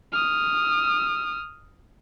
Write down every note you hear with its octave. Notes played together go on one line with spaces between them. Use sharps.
D#6 F6